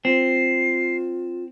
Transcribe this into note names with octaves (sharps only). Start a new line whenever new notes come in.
C4 F4 C7